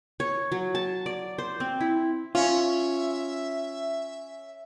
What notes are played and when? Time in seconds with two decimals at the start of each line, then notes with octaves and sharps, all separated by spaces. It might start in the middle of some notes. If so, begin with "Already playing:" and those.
0.20 C#5
0.52 F#3
0.75 A5
1.06 D5
1.38 C5
1.60 C4
1.80 E4
2.35 C#4 F4 E5